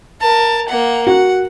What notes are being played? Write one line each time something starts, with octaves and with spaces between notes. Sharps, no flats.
A#4 A5
A#3 F#5
F#4 F#5